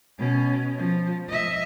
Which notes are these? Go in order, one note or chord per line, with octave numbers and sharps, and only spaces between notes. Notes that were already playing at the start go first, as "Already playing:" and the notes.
B2 C#4
F3
D#5 E5